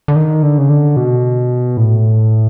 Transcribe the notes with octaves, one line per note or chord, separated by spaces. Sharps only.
D3
D#3
D3
C#3
D3
B2
A2